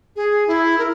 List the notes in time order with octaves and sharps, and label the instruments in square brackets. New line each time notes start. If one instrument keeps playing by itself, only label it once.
[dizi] G#4
E4
A#4